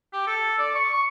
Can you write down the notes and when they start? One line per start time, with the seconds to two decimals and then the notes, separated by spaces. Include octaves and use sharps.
0.13 G4
0.27 A4
0.58 D5
0.75 C#6
0.93 C#6